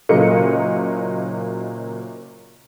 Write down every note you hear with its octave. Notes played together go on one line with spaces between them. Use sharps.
F#1 A#2 F#3 A#3 D#5 C#7